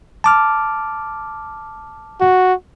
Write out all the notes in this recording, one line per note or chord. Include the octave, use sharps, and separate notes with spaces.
A5 D6 F6
F#4